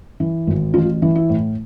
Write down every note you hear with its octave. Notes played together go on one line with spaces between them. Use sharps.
E3
G#1
A1 F4
E3
E4
A2